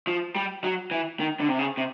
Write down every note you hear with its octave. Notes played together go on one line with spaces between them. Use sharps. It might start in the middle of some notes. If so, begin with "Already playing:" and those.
F3
G3
F#3
E3
D#3
D3
C3
C#3
C3